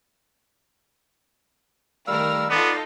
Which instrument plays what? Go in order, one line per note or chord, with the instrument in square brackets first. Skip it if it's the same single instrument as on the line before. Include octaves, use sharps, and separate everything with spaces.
[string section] D#3 A3 A#4 [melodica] G3 F5 E6
[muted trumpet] B3 [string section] D#4 F4 A4 [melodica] D5